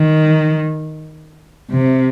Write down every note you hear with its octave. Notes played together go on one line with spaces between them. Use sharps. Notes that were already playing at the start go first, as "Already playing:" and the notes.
Already playing: D#3
C3